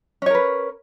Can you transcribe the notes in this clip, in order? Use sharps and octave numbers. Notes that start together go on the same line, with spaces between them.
C#4 A#4 B4 C#5